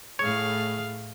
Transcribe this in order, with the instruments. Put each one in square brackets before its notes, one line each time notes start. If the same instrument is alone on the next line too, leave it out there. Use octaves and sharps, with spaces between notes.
[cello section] A2 A3 [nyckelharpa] G#4 F5 [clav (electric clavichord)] C#5